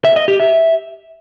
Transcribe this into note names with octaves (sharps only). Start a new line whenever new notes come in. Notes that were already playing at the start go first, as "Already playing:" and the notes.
E5
D#5
G4
E5